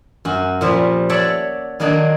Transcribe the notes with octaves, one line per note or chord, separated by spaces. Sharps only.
F#2 F#4
A#2 F3 G3
C#5 D5 E5 F#5 A5
D#3 F#3 A#3 D4 D#4